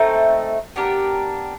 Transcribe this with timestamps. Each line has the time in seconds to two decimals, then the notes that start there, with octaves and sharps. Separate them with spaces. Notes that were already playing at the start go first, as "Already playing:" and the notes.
Already playing: A3 C4 D#4
0.76 B3 D4 G4 A#4